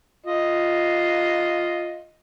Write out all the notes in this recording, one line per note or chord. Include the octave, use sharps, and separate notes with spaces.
F4 D#5